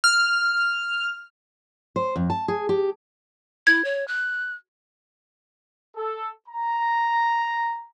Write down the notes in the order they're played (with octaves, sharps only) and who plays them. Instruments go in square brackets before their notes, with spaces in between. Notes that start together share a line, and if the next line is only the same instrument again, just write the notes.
[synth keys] F6
[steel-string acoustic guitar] C5
F2
A5
G#4
G4
[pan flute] E4 [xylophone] G#6
[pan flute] C#5
F#6
[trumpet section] A4
A#5